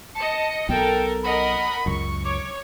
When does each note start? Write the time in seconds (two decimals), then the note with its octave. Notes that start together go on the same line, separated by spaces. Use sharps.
0.15 D#5 A5 C#7
0.69 B1 B2 B3 A4 A#4 G5
1.23 A#4 D#5 F#5 B5
1.86 C#2 F#2 C#6
2.25 C#5 D6